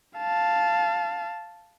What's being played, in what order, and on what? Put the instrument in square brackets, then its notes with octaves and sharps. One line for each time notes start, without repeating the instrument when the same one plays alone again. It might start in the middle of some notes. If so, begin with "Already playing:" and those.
[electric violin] F5 A5